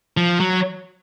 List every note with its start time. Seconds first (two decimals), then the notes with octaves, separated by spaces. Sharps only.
0.17 F3
0.40 F#3